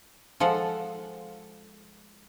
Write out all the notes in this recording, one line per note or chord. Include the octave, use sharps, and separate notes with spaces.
F3 G#3 A4 F#5